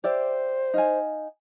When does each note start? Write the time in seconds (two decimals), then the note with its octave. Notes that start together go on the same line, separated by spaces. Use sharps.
0.04 G4 C5 D5 E5
0.74 D#4 F5 G#5